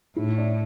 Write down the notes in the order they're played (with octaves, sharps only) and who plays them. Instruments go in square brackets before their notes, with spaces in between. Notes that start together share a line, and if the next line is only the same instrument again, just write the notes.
[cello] A2 [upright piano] E4
[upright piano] D4